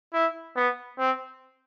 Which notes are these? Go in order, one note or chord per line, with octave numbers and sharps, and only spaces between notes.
E4
B3
C4